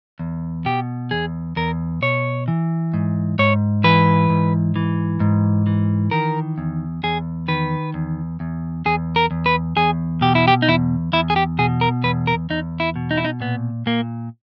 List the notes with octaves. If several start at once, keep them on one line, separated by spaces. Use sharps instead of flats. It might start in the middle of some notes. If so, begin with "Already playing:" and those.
E2
B2 G4
E2 G#4
E2 A#4
B2 C#5
E3
G#2
G#2 C#5
E3 B4
G#2
E3
G#2
E3
D#3 A#4
E2
E2 G#4
D#3 B4
E2
E2
E2 G#4
A#4
E2
B4
E2 G#4
B2 G4
E4
G4
D#4
E2 E4
E2 E4
G#4
G4
B2 G#4
A#4
E2 B4
A#4
E2 D#4
E4
B2
D#4
E4
D#4
A#2 B3
A#2 A#3